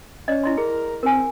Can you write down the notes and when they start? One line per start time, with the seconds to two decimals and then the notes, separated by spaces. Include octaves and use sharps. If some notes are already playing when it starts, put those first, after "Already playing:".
0.28 C#4 D5 D#5
0.44 E4 D#5 C6
0.57 G#4 A#4
1.03 C4 A#4 G#5